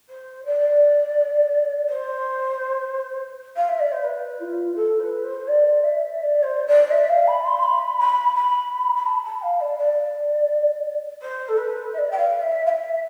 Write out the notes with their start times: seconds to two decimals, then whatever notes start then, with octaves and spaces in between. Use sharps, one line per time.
0.09 C5
0.45 D5
1.88 C5
3.56 F5
3.68 E5
3.80 D5
3.92 C5
4.03 B4
4.40 F4
4.75 A4
4.99 C5
5.03 B4
5.24 C5
5.48 D5
5.83 E5
6.19 E5
6.23 D5
6.43 C5
6.67 D5
6.90 E5
7.08 F5
7.27 B5
7.45 C6
7.63 B5
7.98 B5
8.35 B5
8.95 B5
9.06 A5
9.24 A5
9.42 F5
9.60 D5
9.78 D5
11.22 C5
11.48 A4
11.57 B4
11.93 E5
11.98 D5
12.11 G5
12.17 F5
12.41 E5
12.66 F5
12.69 E5